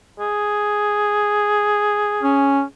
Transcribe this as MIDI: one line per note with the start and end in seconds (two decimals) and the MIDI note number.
0.19 2.71 68
2.22 2.62 61